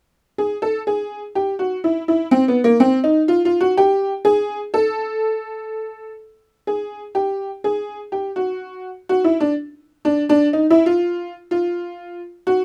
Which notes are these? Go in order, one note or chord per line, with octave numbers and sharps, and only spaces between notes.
G#4
A4
G#4
G4
F#4
E4
E4
C4
B3
A#3
C4
D#4
F4
F4
F#4
G4
G#4
A4
G#4
G4
G#4
G4
F#4
F#4
E4
D4
D4
D4
D#4
E4
F4
F4
F#4